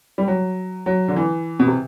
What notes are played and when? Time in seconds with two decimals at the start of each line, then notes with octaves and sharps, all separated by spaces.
0.18 G3
0.28 F#3
0.86 F#3
1.08 D3
1.16 E3
1.60 B2
1.67 C3